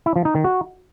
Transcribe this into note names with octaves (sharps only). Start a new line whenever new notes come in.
E4
F3
D#4
D#3
F#4